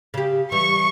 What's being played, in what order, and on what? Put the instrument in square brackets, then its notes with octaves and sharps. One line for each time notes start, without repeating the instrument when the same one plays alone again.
[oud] C#3 G4
[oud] E3 G3 [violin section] C#6